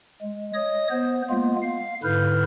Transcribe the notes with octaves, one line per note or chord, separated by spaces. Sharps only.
G#3
C#5 D#5 D#6
B3 C5
G#3 A#3 B3 F4
F5
G#2 D3 E4 B4 F6 G6